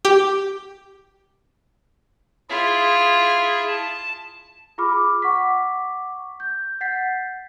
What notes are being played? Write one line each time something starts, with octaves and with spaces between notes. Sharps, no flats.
G4
E4 F4 G#4 E5
A5
F4 G#4 B5 D6 F6
F#5 C#6 D6 B6
G6
F#5 G6 A6 B6 C7